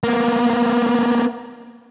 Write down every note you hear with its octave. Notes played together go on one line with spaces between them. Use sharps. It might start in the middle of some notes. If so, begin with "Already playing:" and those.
A#3 B3